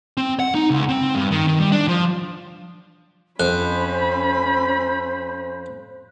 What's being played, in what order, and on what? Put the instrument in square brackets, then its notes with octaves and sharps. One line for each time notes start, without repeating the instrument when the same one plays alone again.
[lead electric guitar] C4
F#5
D#4
C#2
C4
G2
D#3
D#3
G3
D4
F3
[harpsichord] F2 [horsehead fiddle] C#4 B5 [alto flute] C5 [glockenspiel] F#6